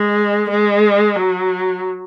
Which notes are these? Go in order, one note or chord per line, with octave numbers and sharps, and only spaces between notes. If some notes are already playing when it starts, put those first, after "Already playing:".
Already playing: G#3
G#3
F#3